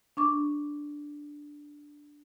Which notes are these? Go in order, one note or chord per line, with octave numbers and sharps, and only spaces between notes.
D4 C#6 D6